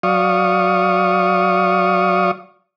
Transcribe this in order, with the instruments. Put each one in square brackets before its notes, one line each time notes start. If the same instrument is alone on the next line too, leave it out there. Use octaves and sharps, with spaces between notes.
[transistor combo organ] F#3 D5 F5 C#6 D#6